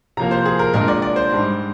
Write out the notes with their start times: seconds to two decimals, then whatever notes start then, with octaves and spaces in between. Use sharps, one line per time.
0.17 C3 F3 A#3 A#5
0.31 C5
0.45 G#4
0.59 A#4
0.74 A#2 G#3 D4 A#4
0.88 D5
1.02 D5
1.16 C5
1.31 G#2 G3 D4